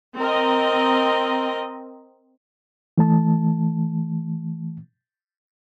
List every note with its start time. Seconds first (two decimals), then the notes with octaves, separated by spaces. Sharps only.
0.18 C4 A#4 D#5
2.98 E3 A3 A5